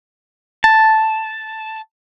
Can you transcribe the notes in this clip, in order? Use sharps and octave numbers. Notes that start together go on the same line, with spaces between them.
A5